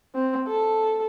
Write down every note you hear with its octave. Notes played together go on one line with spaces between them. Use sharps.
C4
A4